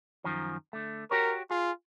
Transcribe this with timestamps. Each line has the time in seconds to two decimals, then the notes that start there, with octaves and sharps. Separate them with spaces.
0.24 F#2 D#3 F3
0.73 D3 A3
1.11 F#4 G4 A#4 C#5
1.51 F4 G#4